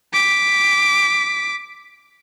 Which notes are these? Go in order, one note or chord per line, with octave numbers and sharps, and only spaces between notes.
D6 B6